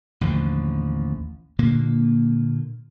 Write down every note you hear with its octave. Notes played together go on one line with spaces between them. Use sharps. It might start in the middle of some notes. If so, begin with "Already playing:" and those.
A1 D#2 D3 F3
A#2 D3 A#3